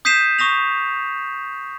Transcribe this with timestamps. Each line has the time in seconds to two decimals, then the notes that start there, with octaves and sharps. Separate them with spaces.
0.05 D#6 G6 B6 C7 D#7 E7
0.39 C#6 D#6 A#6 F7